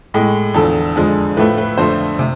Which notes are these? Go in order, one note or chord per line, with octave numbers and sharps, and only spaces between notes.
A2 G#3
E2 D3 F3 A4
F2 D3 G#3
A2 F3 A3 B4
B4
F2 D3 F3 A3 C5
C3